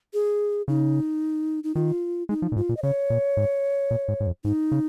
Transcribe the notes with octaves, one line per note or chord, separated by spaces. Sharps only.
G#4
C#3 D#4
D#4
D#3 F4
G#3 D#4
F3
A#2
G#2 F4
A#2
D#5
C#3 C#5
A#2
G#2
A#2
G#2
G#2
F2
G#2 D#4
C#3